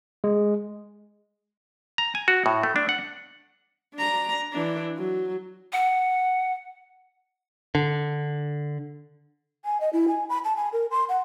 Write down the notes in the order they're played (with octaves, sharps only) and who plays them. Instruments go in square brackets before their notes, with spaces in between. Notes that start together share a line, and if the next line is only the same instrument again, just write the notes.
[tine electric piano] G#3
[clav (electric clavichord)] A#5
G#5
F#4
A2
A3
D4
F#5
[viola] D4 A#5
E3 D4
F#3
[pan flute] F#5
[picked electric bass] D3
[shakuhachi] G#5
D#5
E4
G#5
B5
A5
G#5
A#4
C6
F#5